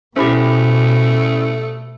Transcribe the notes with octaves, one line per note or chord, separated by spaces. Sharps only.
B2 A3 C#4 E4 G4 C5 B5